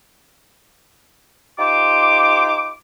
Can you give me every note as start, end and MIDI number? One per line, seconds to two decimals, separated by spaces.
1.59 2.71 63
1.59 2.71 65
1.59 2.71 67
1.59 2.71 72
1.59 2.71 86